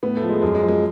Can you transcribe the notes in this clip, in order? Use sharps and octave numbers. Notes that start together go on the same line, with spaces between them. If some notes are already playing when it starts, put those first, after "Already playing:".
A2 B3
A3
F3
G#3
F#2 G#3
G#3
F3
G#3